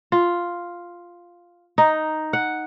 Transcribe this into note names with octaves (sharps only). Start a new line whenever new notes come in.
F4
D#4
F#5